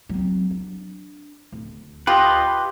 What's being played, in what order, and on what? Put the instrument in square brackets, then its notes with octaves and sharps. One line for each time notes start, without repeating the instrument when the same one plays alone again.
[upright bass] F#3 C4
D4
D1
[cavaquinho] F4 G4 [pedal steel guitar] B4 D#5